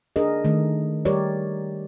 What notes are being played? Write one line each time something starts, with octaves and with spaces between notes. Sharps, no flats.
D4 G#4 A#4 D#5
D#3 A3
G3 G4 A#4 C#5 D5